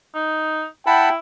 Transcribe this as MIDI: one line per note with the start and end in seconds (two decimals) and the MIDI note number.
0.15 0.65 63
0.86 1.17 64
0.86 1.09 78
0.86 1.12 79
0.86 1.09 81
0.86 1.09 83